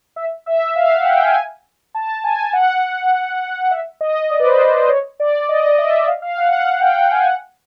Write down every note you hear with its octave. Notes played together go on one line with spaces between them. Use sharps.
E5
E5
F5
F#5
G5
G#5
A5
G#5
F#5
E5
D#5
D5
B4
C5
B4
C5
C#5
D5
D#5
D#5
E5
F5
F5
F#5
F#5
G5
G5
G#5
F#5